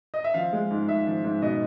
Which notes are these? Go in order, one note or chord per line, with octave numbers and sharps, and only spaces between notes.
D#5
E5
F3 F5
G#3
G#2
G#2 E5
F3
G#2
B2 D#5